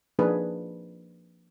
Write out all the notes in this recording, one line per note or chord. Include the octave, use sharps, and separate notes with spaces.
F3 A#3 D4 D#4 G#4 B4